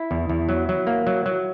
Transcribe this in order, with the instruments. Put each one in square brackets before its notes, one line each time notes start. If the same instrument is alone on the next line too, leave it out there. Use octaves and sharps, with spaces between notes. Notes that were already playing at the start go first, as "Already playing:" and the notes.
Already playing: [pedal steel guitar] E4
[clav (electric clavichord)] E2
E2
F#3
F#3
A#3
F#3
F#3